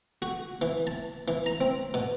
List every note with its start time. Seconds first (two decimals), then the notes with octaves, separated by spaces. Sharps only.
0.22 F#4
0.62 E3
0.87 A5
1.28 E3
1.46 A#5
1.61 C4
1.94 B2